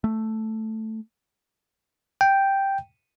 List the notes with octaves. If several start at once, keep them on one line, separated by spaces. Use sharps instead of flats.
A3
G5